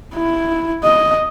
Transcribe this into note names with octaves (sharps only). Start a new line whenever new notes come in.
E4
D#5